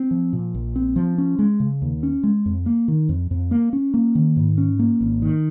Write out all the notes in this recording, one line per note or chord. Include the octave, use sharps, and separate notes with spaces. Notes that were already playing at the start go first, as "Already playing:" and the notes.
Already playing: C4
F3
A#2
A#1
C4
F3
C#4
G#3
C#3
D#2
C#4
G#3
F2
A#3
D#3
F2
F2
A#3
C#4
A#3
D#3
G#2
C#4
A#3
G#1
D#3